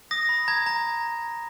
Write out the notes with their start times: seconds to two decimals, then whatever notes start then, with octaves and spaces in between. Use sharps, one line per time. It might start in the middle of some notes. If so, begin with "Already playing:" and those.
0.11 D#6 A#6
0.29 B5
0.48 A#5 G#6
0.66 A#5